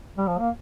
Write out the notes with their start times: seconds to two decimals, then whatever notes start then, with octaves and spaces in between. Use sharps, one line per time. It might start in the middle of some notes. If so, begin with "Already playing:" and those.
0.18 G3
0.28 F3
0.39 A#3